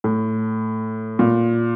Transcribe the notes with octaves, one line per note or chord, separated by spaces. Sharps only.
A2
A#2